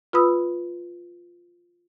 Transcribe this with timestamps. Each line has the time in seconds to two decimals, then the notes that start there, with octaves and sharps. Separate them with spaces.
0.13 F4 B4 B5 D#6 E6